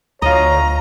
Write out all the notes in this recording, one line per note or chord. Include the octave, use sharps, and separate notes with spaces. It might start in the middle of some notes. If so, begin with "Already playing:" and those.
D2 F4 C#5 D#5 A#5